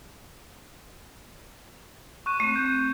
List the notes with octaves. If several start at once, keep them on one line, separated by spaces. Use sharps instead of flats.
C#6 F#6 D#7
A3 C4
G6